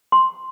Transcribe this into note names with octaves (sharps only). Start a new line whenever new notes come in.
C6